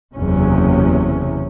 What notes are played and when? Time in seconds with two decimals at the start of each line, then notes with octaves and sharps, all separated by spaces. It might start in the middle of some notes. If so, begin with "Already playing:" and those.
0.14 F#1 E2 C3 C#4